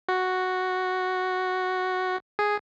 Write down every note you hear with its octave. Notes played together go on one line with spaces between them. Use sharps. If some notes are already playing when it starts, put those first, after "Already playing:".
F#4
G#4